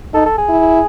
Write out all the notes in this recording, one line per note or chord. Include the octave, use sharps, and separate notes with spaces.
D#4 A4
A4
G#4
E4